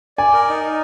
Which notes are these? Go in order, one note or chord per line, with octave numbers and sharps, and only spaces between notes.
D5 G#5
A#4
D#4
D#4